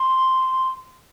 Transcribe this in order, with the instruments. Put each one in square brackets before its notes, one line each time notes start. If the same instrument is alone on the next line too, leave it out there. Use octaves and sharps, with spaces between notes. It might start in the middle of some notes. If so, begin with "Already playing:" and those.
Already playing: [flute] C6